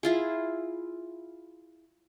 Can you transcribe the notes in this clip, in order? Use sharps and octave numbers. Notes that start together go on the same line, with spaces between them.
E4 F4 G#4